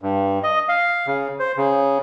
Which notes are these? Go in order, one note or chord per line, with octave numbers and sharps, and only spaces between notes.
G2
D#5
F5
C#3
C5
C#3